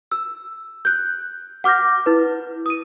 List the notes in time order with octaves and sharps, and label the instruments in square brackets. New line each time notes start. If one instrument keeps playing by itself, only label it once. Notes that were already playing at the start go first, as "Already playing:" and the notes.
[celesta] E6
F#6 G6
F#5 D6 F6 G6 A#6
E4 B4
D#6 D#7